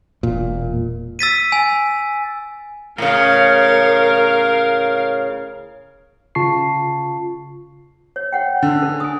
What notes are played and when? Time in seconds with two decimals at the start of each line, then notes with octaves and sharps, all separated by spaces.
0.23 E1 A#2
1.19 E6 A6 B6 D#7
1.52 G#5
2.98 A2 C#3 A#4 F5
6.35 C#3 F4 A5 C#6 C7
8.16 C#5
8.32 C#5 F#5 G5
8.62 D3
8.82 D4 A4
9.00 G#5 D#6